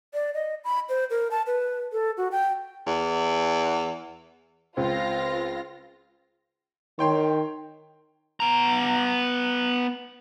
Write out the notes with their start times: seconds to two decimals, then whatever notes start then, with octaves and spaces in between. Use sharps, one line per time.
0.14 D5
0.34 D#5
0.64 B5
0.89 C5
1.10 A#4
1.31 A5
1.47 B4
1.92 A4
2.17 F#4
2.32 G5
2.87 E2
4.77 C#2 C4 F4 A#6
6.99 D#3 C#5 G5 C6
8.40 B3 A#5